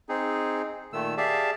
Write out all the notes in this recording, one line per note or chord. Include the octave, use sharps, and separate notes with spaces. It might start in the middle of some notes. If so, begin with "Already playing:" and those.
C4 D#4 G#4
A#2 D#3 A3 E6
G4 G#4 D5 E5 F5 A5